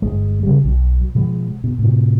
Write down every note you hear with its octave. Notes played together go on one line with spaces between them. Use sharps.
G1 D#2 G#3
C#3 G3
B1 F#3
B2 F3 G#3
B2
A2 C3